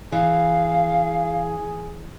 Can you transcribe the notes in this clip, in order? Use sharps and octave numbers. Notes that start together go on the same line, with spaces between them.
E3 G#4 F5